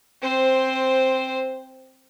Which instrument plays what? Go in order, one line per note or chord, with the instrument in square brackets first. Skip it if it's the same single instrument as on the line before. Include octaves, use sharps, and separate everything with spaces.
[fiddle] C4 C5